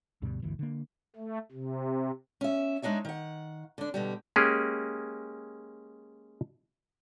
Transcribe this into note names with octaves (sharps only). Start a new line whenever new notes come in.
D2 G2 B2 G3
G1 D2 E3
D3 A#3
A3
C3
C#4 E5
G#3 D4 D#4 C#5 E5
D#3 F#5
D3 D4
B2 D3 G3
G#3 A#3 C#4 G4 G#4